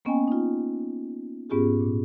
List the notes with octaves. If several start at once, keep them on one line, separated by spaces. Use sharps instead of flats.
A#3 B3 C#4 D#5 G5 G#5
D#4 F4
G#2 B3 C#4 F4 G4 G#4
A#2